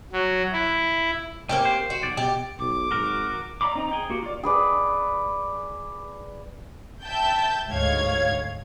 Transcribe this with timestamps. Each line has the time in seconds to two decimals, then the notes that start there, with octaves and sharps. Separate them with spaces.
0.13 F#3
0.52 E4
1.49 A2 A#3 C4 C#4 G4
1.65 C5
1.90 F#4
2.03 B1 D5
2.17 B2 G4
2.59 B1 D6
2.91 G#1 F#4 A#4
3.61 D5 F5 A#5 B5 D6
3.75 C4 D#4 A#5
3.91 G#4 G5
4.10 A#3 F#4 G4
4.23 F4 D5
4.43 G#4 B4 D5
7.04 E5 G5 A5 G6
7.69 D2 G#2 C#5 F5 G#6